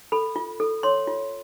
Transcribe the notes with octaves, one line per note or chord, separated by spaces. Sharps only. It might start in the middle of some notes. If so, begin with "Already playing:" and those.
A4 B5
F4
A4
C#5 C6
F4